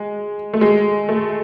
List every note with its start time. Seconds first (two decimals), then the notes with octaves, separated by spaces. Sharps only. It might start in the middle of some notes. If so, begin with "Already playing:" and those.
Already playing: G#3
0.54 A3
0.61 G#3
1.09 A3